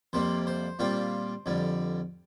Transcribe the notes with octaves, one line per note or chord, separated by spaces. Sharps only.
F2 C3 G3 A#3 C5
C5
A#2 G3 C4 F4
F2 D3 G3